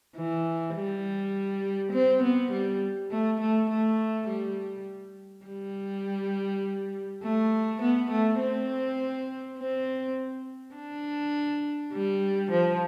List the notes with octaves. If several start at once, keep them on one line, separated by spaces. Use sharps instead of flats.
E3
G3
C4
B3
G3
A3
A3
A3
G3
G3
A3
B3
A3
C4
C4
D4
G3
F3